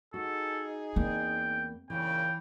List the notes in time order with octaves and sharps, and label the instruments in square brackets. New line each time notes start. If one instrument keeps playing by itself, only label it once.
[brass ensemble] D#4 G#4 [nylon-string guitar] F#4 [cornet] A4
[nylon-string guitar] E2 A#3 [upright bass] C4 [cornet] G5
[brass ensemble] D#2 A#2 C#3 [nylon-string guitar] E3 [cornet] G5